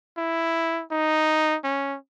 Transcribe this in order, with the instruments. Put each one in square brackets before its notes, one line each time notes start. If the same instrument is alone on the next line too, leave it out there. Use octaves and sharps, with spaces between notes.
[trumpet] E4
D#4
C#4